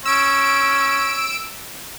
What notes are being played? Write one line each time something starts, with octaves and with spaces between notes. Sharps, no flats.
C#4 E6 D7